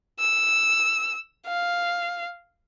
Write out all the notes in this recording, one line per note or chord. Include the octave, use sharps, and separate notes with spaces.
E6
F5